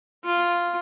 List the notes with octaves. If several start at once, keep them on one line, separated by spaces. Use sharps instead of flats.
F4